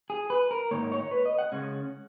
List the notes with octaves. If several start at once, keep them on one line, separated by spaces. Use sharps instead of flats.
G#4
B4
A#4
G#2 D#3 A#3 C#5
C#5
B4
D#5
F#5
C#3 G#3 C#4